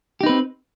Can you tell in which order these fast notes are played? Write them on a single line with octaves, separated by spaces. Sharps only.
G4 D#4 B4 C4